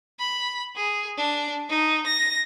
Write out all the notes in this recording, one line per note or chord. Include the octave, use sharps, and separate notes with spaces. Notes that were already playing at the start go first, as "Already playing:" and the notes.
B5
G#4
D4
D#4
A#6